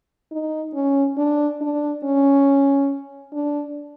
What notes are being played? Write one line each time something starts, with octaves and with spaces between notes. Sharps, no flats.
D#4
C#4
D4
D4
C#4
D4